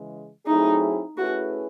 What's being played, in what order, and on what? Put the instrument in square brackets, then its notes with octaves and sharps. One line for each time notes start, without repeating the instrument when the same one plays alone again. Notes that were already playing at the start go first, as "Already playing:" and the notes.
Already playing: [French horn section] C#3 E3 G#3
[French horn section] F#3 A3 C4 E4 G#4 [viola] D#4
[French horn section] A3 C#4 E4 G#4 B4 [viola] F#4